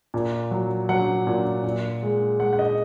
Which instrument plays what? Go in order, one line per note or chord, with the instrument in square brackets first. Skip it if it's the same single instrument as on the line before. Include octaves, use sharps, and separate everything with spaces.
[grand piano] A#2
F#3
F#3 F#5
A#2
A#2
G#3
G#3 F#5
F#5
D#5